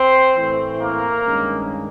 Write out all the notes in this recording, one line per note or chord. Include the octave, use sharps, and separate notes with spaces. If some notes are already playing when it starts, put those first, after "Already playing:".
Already playing: C4 C5
A2 E3 A3 C4 E4
A#3 A#4
G2 D#3 G#3 C#4